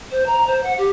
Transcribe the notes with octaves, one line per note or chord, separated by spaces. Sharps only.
C5
A#5
C5
F#5
G4